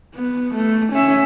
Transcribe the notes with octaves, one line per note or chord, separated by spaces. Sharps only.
B3
A3
C#4 E5